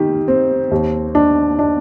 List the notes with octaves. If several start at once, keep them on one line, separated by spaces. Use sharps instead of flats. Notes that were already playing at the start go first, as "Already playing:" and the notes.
Already playing: D#3 G4
C4
D#2
D4
D4